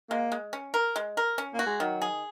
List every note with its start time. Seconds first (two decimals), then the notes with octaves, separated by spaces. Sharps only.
0.10 G#3 A#3
0.32 G#3
0.53 C#4
0.74 A#4
0.96 G#3
1.17 A#4
1.38 C#4
1.54 A#3
1.59 F#4
1.66 G#3
1.80 D#3 F#3
2.02 G#4